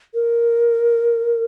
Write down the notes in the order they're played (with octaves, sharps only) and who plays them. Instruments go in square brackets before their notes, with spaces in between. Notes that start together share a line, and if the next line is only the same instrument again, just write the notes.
[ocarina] A#4